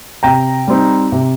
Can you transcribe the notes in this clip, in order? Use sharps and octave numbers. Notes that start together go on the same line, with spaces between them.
C3 G5 A#5
G3 C4 D#4
C3